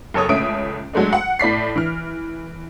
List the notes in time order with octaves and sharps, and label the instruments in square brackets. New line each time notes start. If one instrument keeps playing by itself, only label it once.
[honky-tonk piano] F#1 A4 C#5 D#6
C#2 A3 C#4 E5 D#6 D7
F#3 G#3 A3 D4
F#5
A2 D5 B6 C7
E3 F6